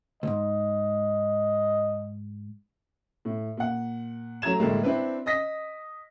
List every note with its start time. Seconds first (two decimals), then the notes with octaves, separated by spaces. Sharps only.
0.23 C#2 G#2 D#5
3.25 A2
3.57 A#2 F#5
4.42 F#3 A3 A#5 G#6 E7
4.59 A2 D3 G3 G#3 A#3
4.83 C4 D4 E4 B4
5.26 D#5 D#6 A#6 B6